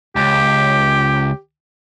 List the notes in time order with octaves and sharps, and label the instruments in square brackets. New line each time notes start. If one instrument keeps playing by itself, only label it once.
[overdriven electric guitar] C#2 [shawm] G4